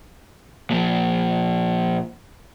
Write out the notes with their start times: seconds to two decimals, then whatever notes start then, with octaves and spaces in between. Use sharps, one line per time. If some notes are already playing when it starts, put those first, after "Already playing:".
0.71 A#2 F3